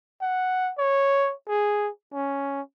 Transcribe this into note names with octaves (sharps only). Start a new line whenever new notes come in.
F#5
C#5
G#4
C#4